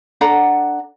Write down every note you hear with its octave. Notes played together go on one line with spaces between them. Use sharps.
D4 A4 F#5 A#5